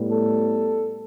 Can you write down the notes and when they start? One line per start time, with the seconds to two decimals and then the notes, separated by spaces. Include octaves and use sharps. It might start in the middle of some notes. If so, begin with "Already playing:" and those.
Already playing: A2 G3 B3
0.11 A4